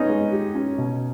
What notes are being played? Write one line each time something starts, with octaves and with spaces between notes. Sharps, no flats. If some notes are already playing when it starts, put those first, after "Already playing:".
Already playing: B3 C#4 D#4
G#3
G4
C#4
B2